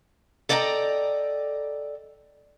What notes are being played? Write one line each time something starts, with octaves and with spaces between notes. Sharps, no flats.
A4 D5 D#5 G5 G#5 A#5